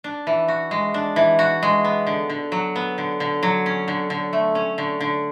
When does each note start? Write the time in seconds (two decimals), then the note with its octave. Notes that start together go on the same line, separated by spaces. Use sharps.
0.04 D4
0.27 E3
0.48 F#4
0.71 G#3
0.94 D4
1.16 E3
1.39 F#4
1.63 G#3
1.85 B3
2.07 D3
2.30 D3
2.52 F#3
2.76 B3
2.98 D3
3.20 D3
3.43 F#3
3.66 C#4
3.88 D3
4.10 D3
4.33 A3
4.55 C#4
4.78 D3
5.00 D3